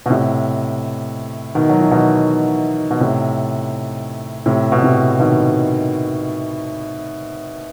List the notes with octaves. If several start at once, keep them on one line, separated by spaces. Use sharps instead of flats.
B2
A2 C3
B2 D#3
F#3
E3
B2 D#3
B2
A2 C3
A2 C3
B2
A2 C3
B2 D#3